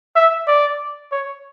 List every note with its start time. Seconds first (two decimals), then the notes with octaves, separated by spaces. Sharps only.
0.16 E5
0.48 D5
1.12 C#5